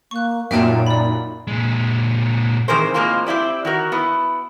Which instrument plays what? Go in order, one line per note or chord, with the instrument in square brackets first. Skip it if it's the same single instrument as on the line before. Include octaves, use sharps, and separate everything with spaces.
[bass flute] A#3 [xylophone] C#6 F#6
[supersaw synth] F#2 A#2 [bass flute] D#4 [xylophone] E5 G5 A5
[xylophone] D5 B5
[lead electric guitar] A#2 G#3
[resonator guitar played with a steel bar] D#3 E3 C4 G#4 A#4 C5
A2 G#3 A#3 C4 F4
C4 E4 G4 D5
D#3 F#4 A#4
B3 E4